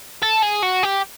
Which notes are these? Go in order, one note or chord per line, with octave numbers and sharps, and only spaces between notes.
A4
G#4
F#4
G4